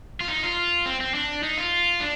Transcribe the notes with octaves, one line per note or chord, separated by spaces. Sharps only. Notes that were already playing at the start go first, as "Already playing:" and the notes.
F4
D#4
F4
C4
C4
D4
D#4
F4
D4